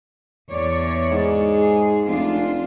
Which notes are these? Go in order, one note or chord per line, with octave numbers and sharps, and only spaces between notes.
E2 C#5 D5
G#2
G#4
F1 D4 F4